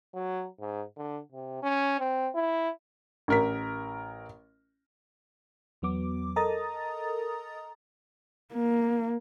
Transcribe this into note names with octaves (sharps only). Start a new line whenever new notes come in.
F#3
G#2
D3
C3
C#4
C4
E4
A1 A#4 B6
E2 F#3 B3 D6
A4 A#4 D#5 A#5 D#6 A6
A#3